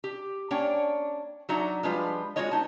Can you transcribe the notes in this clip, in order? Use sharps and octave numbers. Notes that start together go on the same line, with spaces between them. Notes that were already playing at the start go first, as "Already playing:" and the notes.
G4
A#3 C#4 D4 C#5 G5
F#3 D4 D#4 F#4 E5 A#5
F3 G3 G#3 D4 F4 B4
G#3 C#4 F4 F#4 C#5 D#5
B3 D#4 A5